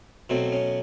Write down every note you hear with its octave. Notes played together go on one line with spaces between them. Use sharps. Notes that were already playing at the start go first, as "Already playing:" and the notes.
B2 F#3 A3 C4
C#4